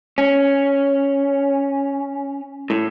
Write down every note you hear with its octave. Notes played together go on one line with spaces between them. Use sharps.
C#4
A2